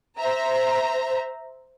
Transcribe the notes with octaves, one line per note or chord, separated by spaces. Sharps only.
C5 E5 A#5